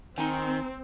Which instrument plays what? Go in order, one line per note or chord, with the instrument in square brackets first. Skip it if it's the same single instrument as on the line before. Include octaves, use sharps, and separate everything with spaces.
[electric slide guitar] D#3 [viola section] C4 [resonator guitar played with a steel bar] D#4 G#5